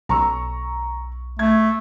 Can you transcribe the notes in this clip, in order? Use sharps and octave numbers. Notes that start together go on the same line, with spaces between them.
B1 A#5 C#6 E6
A3 G#6